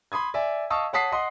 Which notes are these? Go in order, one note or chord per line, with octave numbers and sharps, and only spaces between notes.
B5 C6 D#6 G#6
D5 E5 G#5
D#5 F5 A5 C#6 D#6 E6
C#5 F#5 A5 D#6 B6 C7
D#5 F#5 C6 D#6